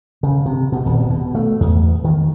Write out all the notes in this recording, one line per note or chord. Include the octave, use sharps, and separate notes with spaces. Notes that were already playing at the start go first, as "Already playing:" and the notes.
C#3
C3
B2
D#1
B2
A3
E2
D#3